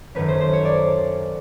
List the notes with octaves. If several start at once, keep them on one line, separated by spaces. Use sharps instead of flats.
F#2 D#3 F#3 A3 C#4 B4
C5
C5
C#5
D5